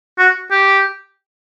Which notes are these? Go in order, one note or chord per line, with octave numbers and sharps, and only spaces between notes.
F#4
G4